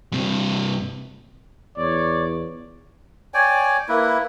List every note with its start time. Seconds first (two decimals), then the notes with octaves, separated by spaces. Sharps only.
0.12 G2 C3
1.78 E2 C#5 D5
3.34 C#5 D5 G5 G#5
3.89 A#3 E4 B4